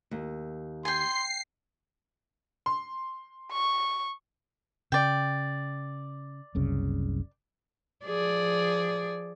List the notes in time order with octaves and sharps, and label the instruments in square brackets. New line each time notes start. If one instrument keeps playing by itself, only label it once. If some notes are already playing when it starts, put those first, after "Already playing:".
[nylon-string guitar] D#2
[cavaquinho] G5 G#5 [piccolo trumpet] C6 [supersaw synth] C7
[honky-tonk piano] C6
[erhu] C#6
[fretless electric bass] C#3 [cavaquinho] D5 G5
[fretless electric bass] F#1 C2 C#3
[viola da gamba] F3 G#4 D5